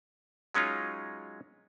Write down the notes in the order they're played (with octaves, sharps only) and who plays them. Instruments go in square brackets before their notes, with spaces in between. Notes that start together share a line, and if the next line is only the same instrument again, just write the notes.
[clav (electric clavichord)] F#3 G#3 C#4 D#4 F4